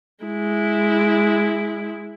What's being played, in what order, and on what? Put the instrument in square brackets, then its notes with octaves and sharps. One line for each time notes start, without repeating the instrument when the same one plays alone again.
[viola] G#3 E4